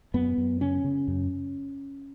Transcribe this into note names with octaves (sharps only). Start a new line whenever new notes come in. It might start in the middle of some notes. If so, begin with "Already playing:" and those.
F#2 B3
F#2
C#3 C#4
C#3
F#2